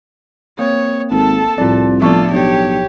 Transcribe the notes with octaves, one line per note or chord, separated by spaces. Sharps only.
A#3 C4 C#5
G#1 A4 A5
C2 A2 F3 F4 D5
F3 A3 B3 D4 F4 A4 D5 C#6
B1 D4 G4 C#5